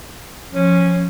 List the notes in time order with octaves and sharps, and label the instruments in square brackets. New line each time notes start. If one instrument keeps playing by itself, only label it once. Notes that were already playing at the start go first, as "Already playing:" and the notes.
[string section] F3 [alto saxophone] C#4